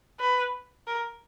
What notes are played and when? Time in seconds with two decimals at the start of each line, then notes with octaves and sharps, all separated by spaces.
0.20 B4
0.87 A#4